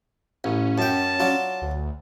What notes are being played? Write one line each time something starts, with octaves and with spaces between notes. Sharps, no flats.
A1 C#4
F#2 G5 A5
F#3 D4 F4
D2